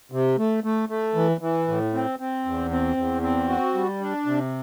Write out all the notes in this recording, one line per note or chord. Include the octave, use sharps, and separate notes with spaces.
C3
A3
A3
A3
E3
E3
A2
C4
C4
E2
C4
E2
C4
F#4
G3
D4
C3